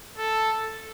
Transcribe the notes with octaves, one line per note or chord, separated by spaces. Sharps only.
A4